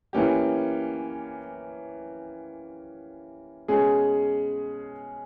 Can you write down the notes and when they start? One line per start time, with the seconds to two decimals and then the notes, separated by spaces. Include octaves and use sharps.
0.13 E3 A#3 C#4 G4
3.68 B2 G#3 C#4 G#4